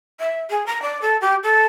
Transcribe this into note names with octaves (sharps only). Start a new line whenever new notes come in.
E5
G#4
A#5
D5
A4
G4
A4